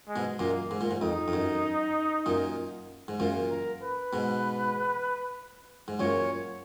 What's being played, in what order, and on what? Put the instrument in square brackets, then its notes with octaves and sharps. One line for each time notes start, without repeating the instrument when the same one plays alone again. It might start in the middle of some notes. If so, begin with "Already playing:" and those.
[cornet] G#3
[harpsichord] G#2 B2
[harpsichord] F#2 A#2 [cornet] A#3
[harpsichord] G#2
A#2
G#2
[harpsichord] F2 [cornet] D#4
[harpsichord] F2
F#2
F#2 A#2
G#2
[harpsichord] F#2 A#2 [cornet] F4
[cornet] A#4
B4
[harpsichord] G#2 B2
G#2
[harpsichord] F#2 A#2 [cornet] C#5